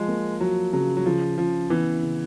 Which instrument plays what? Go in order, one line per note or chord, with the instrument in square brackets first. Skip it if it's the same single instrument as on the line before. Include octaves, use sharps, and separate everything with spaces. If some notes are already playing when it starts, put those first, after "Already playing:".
Already playing: [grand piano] F3 [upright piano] G#3
[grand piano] A#3
[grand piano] F3 [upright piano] F#3
[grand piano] C#3 [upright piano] F#3
[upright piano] F#3
[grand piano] C#3 [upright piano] F3
[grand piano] C#3 [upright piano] F3
[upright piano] E3 [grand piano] B3
[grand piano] C#3